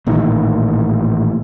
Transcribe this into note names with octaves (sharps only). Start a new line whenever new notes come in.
A1 A#2 D#3 E3